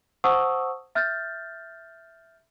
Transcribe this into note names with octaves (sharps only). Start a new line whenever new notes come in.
C5 F#5 A5 C#6 D#6 E6
E5 F6 G6 A6